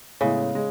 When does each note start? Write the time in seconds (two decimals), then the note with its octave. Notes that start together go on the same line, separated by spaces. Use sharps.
0.21 A2 C#3 G#3 B3 E4
0.55 G#3